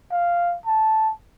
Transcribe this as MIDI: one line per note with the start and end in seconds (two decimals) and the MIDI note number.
0.11 0.57 77
0.66 1.12 81